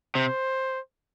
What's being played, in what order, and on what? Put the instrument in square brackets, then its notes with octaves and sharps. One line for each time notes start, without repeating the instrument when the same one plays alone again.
[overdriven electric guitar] C3 [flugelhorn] C5